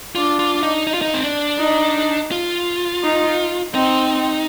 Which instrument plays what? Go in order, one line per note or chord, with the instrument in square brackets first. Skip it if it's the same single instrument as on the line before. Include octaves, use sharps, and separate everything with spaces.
[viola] D4 [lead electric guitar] F4
[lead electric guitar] F4
D#4
D#4
F4
D#4
C4
D4
[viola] D#4
[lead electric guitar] F4
[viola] D#4
[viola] C4 [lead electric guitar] D#4